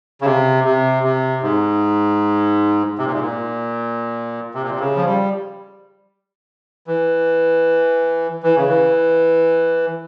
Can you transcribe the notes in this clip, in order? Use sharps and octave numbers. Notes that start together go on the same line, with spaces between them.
C#3
C3
C3
C3
G#2
C3
A#2
G#2
A#2
C3
A#2
C3
C#3
F3
G3
E3
E3
C#3
E3